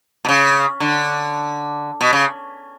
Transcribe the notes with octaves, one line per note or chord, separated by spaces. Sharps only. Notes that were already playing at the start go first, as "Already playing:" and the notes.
B2
C#3
D3
B2
C#3